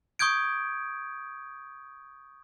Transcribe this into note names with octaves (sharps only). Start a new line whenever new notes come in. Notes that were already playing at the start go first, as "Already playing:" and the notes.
C#6 D#6 G6 G#6 D7